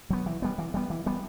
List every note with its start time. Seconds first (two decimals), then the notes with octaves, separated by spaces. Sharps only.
0.10 F#3 B3
0.26 E3
0.42 G3 B3
0.58 E3
0.74 G3 B3
0.90 E3
1.06 G3 B3